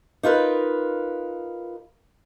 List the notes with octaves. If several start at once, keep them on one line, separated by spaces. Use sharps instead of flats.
D#4 F4 A#4 B4